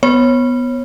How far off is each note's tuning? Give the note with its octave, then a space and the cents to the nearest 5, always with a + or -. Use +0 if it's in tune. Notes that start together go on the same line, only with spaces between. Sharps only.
B3 +0 C#5 -25